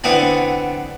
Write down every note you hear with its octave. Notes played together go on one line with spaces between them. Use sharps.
D3 B3 C4 E4 G#5